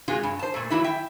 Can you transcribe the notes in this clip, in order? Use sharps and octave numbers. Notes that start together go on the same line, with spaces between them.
C3 G#3 F4 F#4 G#4
G2
C5 A5
A#2 A3
E3 F#3 E4 E5
E5 G5